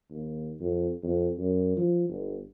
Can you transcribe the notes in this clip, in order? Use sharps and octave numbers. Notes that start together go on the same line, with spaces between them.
D#2
F2
F2
F#2
F3
G1